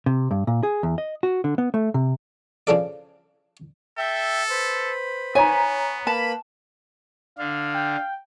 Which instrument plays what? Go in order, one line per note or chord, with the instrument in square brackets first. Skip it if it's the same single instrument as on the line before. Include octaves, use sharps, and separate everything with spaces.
[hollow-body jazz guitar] C3
G2
A#2
G#4
E2
D#5
F#4
D3
B3
A3
C3
[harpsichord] C#3 F3 D4 A4 D5
[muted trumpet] A4 [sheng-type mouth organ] E5 G5
[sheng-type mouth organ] B4 C5
[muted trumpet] B3 [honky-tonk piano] C#5 A#5 [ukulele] G#5
[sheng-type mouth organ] A#3 B4 B5 [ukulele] A5
[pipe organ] D3 D4 [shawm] F5
[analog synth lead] G5